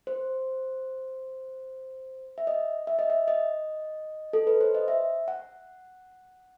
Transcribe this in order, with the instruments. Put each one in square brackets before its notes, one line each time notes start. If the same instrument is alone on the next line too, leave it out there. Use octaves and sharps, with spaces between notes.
[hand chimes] C5
E5
D#5
E5
D#5
E5
D#5
A4
B4
C5
D#5
E5
F#5